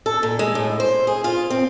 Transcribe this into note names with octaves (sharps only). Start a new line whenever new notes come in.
A4
A#2
G#3
A2
C5
G#4
F4
C4